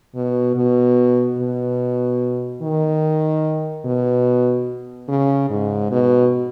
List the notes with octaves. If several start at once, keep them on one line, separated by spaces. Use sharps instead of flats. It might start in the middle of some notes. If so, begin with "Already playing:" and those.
B2
B2
B2
D#3
B2
C#3
G#2
B2